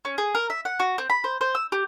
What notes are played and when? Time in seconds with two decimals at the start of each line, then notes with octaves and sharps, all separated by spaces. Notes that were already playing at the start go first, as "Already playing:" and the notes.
0.05 C#4
0.18 G#4
0.35 A#4
0.50 E5
0.65 F#5
0.80 F#4
0.98 C4
1.10 B5
1.24 C5
1.41 C5
1.55 E6
1.72 G4